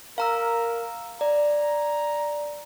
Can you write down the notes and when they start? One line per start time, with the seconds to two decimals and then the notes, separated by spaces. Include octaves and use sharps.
0.18 A#4 F5 A#5 E6
1.21 D5 A#5